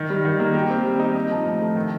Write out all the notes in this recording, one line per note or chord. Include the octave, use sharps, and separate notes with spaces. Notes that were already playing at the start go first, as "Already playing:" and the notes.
Already playing: D#3
G3
D#3
A#3
G4
C4
G3
D#4
D#4
F3
A2
A3
D#3